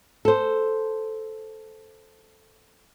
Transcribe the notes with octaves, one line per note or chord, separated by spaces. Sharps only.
A4 C5